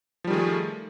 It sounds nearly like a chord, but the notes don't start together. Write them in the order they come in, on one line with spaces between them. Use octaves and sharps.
F3 G3 D#3 G#4 A3